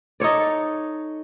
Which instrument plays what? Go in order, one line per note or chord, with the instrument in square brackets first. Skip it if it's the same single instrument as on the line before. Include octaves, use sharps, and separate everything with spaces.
[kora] D#4 A4 C#5 D5